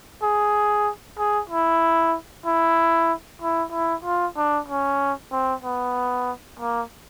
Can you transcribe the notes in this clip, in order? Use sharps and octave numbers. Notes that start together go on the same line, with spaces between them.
G#4
G#4
E4
E4
E4
E4
F4
D4
C#4
C4
B3
A#3